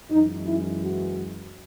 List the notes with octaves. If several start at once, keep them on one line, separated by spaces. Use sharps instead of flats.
F#2 E3 G#3 D#4
E4
F#4